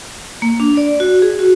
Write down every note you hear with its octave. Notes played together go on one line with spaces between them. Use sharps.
A#3
D4
D5
F#4
G#4
F#4